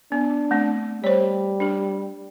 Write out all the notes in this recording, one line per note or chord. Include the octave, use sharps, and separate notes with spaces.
B3 D4
A3 C4
G3 C5 C#5
D4 G4